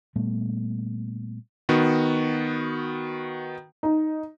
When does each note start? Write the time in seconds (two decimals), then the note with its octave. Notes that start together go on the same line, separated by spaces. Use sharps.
0.16 A#2 G3 A3 B3
1.69 D#3 B3 F#4
3.83 D#4